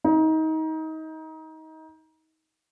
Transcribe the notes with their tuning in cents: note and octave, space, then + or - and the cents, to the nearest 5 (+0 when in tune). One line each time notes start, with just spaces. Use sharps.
D#4 +25